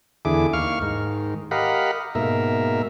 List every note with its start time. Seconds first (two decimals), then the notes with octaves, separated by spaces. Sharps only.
0.25 E2 D3 E4 G#4 D6
0.53 D#2 F5 C#6 F6
0.82 G#2 D#3
1.51 G4 A#4 D#5 F5 F#5 B5
2.15 G#2 B2 A#3 A#4 E5